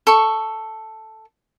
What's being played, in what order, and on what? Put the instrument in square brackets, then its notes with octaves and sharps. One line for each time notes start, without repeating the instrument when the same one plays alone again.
[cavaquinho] A4 C#6